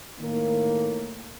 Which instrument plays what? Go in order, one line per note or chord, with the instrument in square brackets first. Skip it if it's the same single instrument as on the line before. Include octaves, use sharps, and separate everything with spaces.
[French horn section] A2 D#3 A#3